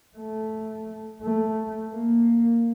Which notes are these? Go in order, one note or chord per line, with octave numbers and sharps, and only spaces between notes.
A3
A3
A#3